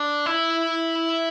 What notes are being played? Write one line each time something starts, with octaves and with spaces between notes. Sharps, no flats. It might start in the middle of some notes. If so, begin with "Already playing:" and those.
Already playing: D4
E4